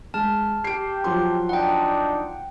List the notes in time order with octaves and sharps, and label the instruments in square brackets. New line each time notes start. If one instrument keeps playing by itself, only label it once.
[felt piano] G#3 [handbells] A5 F6
[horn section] G4 [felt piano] C7 D7
[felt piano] F3 F#3 C6
[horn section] D4 D#4 [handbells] F#5 G5